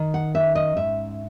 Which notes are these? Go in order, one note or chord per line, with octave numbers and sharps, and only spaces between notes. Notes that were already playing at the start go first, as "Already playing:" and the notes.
Already playing: D#3
F#5
C#4 E5
D#5
G#2 E5